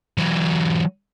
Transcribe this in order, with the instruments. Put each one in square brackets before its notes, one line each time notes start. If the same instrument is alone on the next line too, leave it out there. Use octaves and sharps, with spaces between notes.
[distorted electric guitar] E3 F#3